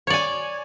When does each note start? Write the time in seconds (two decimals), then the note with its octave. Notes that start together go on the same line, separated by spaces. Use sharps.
0.07 C#5
0.10 D5
0.14 G#5